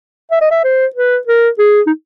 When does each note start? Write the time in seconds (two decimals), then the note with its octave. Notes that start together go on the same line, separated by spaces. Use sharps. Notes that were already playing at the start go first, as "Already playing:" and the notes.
0.31 E5
0.41 D#5
0.51 E5
0.64 C5
0.95 B4
1.27 A#4
1.59 G#4
1.87 D#4